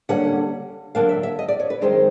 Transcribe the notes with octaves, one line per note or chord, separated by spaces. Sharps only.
D3 G3 A#3 C#4 F#5
D3 F#3 A#3 D4 F5
E5
E5
D#5
D5
C#5
B4
F#2 D#3 G#3 C4 D#4 C5